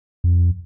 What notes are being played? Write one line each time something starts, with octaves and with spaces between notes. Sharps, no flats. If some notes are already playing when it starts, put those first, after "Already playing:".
F2